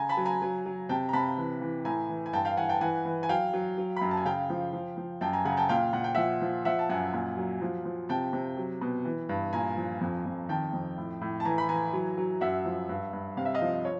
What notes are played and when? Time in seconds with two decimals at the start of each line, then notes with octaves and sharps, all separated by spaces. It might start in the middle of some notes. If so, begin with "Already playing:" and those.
Already playing: C#3 G#5 A#5
0.09 A5 B5
0.17 F#3
0.25 G#5 A#5
0.42 F#3
0.66 F#3
0.89 C3 G5 A5
1.09 A#5
1.13 C3 A5 B5
1.37 E3
1.61 E3
1.85 A2 G#5 A#5
2.09 E3
2.26 G#5
2.33 G2 G5 A5
2.45 F5 G5
2.57 E3 F#5 G#5
2.69 G5 A5
2.81 E3 F#5 G#5
3.05 E3
3.23 G#5
3.29 F#3 F5 G5
3.53 F#3
3.78 F#3
3.97 B5
4.01 F#2 A#5
4.11 A5
4.17 G#5
4.25 C#3 F5 G5
4.50 F3
4.73 F3
4.97 F3
5.21 F#2 G5 A5
5.33 G#5 A#5
5.45 C#3 F#5 G#5
5.52 A#5
5.57 G5 A5
5.69 A#2 F5 G5
5.93 A#2 F#5
6.04 G5
6.15 F3 E5 F#5
6.41 F3
6.65 F3 E5 F#5
6.79 A5
6.89 F#2 F#5 G#5
7.14 A#2
7.37 F#3
7.61 F3
7.85 F3
8.09 C3 G5 A5
8.33 C3
8.57 F#3
8.81 B2
9.05 E3
9.29 G2
9.53 A#2 G#5 A#5
9.77 F3
10.01 F2
10.26 F2
10.49 D#3 G5 A5
10.73 F2
10.98 A2
11.21 A2
11.40 A5
11.45 E3 G#5 A#5
11.58 B5
11.69 E3 G#5 A#5
11.93 F#3
12.17 F#3
12.41 F#2 E5 F#5
12.65 F3
12.89 G2
13.13 G2
13.37 C3 F5
13.45 E5
13.54 D#5 F5
13.61 F3
13.85 C#5